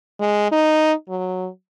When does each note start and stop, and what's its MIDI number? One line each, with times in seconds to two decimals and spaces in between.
0.20 0.51 56
0.52 0.92 63
1.09 1.48 54